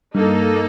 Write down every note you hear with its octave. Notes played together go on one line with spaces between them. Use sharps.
G2 A#3 D#4 A4